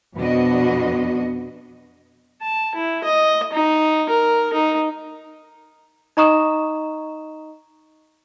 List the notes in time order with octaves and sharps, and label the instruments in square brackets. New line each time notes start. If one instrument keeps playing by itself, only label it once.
[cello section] F2 B2 B3 D4 F#4 D#5
[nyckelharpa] A5
E4
D#5
D#4
A#4
D#4
[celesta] D#4 D#5 A#5 C#6 D#6 E7